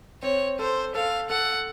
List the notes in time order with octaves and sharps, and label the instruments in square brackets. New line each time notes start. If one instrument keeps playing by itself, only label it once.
[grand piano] C4 [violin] C#5
[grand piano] A4 [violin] C5
[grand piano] A4 [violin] F5
[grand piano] A4 [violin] F#5